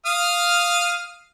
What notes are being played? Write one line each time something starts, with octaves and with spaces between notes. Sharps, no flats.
F5 D#6 F6